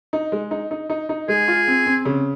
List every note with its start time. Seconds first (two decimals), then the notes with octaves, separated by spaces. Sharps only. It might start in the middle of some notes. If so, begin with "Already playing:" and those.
0.13 D#4
0.32 G#3
0.51 D#4
0.71 D#4
0.90 D#4
1.09 D#4
1.28 G#3 G#4
1.48 F4
1.68 C4
1.86 C4
2.05 C#3